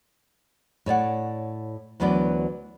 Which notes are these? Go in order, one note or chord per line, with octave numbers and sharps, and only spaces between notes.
A2 C#5 D5 F#5
D2 E3 F#3 B3 B4 D5